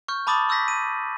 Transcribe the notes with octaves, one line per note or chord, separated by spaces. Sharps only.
C#6 F6 G6
A5 B5 D6 D#6 A6 F#7
C#6 E6 G6 A#6 B6
D#7